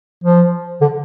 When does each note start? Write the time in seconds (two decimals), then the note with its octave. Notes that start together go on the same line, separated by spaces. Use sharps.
0.24 F3
0.81 D3